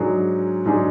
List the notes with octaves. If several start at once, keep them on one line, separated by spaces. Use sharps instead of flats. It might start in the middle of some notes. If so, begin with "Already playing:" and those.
Already playing: G#2 F#3 D4 G#4
G#2 F#3 D4 G#4